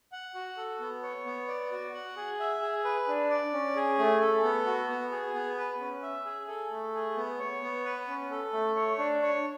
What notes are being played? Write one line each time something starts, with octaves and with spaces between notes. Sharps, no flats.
F#5
F#4
A4
B3
C#5
B3
D5
F#4
F#5
G#4
E5
G#4
B4
D4
D5
C#4
G#4
A3
A4
B3
F#4
B3
G#4
B3
B4
C#4
E5
G#4
A4
A3
G#4
B3
C#5
B3
B4
C#4
A4
A3
C#5
D4
C#5